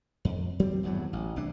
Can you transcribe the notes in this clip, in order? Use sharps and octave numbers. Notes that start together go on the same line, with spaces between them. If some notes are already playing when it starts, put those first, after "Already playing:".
F2
F#3 G3 C4
G#1 E2 G2 F#3
A1
C2 E3 D4